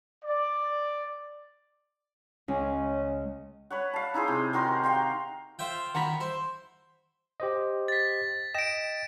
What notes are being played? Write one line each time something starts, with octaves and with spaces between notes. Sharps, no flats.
D5
C#2 C#4
B4 C#5 F#5
F5 A5
D#4 E4 G#4 C5
C3
D#3 F#4 A#4 C6
F5 G5 C6
F4 C5 E5 G5
D#3 F#5 A#5 B5
E4 C5
G4 C5 D#5
A6 B6
D#5 G5 A#6 D7 E7